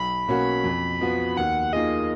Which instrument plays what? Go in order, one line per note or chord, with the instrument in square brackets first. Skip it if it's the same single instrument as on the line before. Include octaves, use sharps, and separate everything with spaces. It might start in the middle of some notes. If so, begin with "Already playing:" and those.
Already playing: [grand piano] B1 [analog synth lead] B5
[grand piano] B2 A#3 C#4 F#4
F2
F3 B3 F#4
[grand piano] D#2 [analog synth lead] F#5
[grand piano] D#3 A#3 F4 G#4 [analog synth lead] D#5